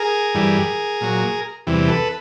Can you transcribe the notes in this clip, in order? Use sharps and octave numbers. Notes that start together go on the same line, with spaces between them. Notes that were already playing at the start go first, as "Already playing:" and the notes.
Already playing: G#4 A#4
G2 E3 G3
A#2 F#3
E2 C3 E3 G3
A4 B4